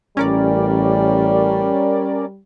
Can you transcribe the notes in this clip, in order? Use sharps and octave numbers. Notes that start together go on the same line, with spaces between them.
A1 G3 C#4 A#4 D5